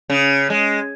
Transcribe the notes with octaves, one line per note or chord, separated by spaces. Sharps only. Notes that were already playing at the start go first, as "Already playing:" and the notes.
C#3
G#3